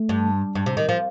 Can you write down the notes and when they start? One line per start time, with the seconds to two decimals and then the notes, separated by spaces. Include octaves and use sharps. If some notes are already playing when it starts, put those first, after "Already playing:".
Already playing: A3
0.09 G2
0.55 G2
0.66 C3
0.77 D#3
0.89 F3